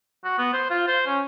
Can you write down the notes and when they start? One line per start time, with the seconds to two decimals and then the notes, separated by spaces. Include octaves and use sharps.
0.24 F#4
0.38 B3
0.53 C5
0.70 F4
0.87 C5
1.06 C#4